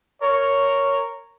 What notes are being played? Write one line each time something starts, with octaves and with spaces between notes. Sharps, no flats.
A#4 C#5